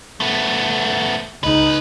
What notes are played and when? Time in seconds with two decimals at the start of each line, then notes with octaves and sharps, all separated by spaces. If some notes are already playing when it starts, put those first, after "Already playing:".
0.20 A3 B3
1.43 C#2 C#4 D#4 B4